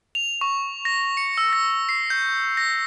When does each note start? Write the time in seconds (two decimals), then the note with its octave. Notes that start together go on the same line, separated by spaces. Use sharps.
0.15 F7
0.41 C#6
0.85 A#6
1.17 C#7
1.38 E6
1.53 A#6
1.89 C7
2.10 G6
2.57 A#6